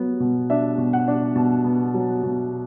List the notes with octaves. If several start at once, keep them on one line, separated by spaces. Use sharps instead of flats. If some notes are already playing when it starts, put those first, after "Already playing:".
Already playing: F#3 B3
B2
D4 E5
B2
F#5
D4
B2 A5
B3
F#3
B2